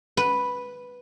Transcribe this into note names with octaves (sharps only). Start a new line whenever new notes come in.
B4